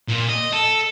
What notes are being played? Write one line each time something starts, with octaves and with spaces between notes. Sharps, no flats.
A#2
D#5
A4